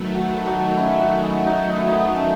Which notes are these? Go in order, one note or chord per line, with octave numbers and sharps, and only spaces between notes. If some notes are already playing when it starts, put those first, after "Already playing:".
Already playing: D#3 F#3 A3 B4
F#4 A4
D#4 F#4
C#4 E4
D#4 F#4
E4 G#4
D#4 F#4
D#4
E4
B3 D#4
A3 C#4